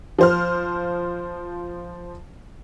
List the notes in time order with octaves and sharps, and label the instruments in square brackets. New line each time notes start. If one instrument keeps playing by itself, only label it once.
[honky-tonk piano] F3 C5 F6